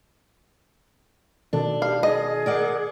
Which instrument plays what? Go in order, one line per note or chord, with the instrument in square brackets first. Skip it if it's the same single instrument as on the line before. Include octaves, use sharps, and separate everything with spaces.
[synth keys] B2 D#3 A4 [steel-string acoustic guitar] D4
[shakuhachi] G4 [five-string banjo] F5
[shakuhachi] G#4 [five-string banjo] D#5
[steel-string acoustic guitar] A#4 D5 F#5